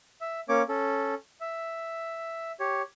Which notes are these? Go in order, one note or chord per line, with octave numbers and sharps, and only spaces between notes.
E5
A#3 C#4 C#5 D6
C#4 A4
E5
G4 C#5